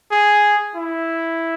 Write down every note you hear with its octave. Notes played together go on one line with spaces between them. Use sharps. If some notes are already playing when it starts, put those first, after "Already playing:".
G#4
E4